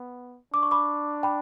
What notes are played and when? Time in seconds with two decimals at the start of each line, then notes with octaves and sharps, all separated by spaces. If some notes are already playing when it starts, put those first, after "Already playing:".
Already playing: B3
0.53 D4 D6
0.63 C#6
0.71 B5 D6
1.23 G5 B5